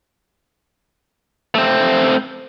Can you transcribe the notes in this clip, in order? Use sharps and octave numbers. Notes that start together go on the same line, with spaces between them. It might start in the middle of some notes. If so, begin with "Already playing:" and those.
A3 C4